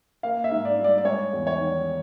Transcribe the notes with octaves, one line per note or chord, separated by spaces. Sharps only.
A#3 F5
E5
G#2
D5
G3
D5
D5
G#3 C#5
E2
C#5
D#3